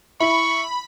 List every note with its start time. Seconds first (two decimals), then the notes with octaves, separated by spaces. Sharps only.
0.20 E4 B5 C#6